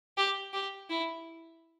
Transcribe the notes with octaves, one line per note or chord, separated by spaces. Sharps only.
G4
G4
E4